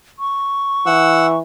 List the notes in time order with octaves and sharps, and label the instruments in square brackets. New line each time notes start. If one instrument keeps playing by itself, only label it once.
[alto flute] C#6
[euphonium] E3 [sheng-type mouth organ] F#5 E6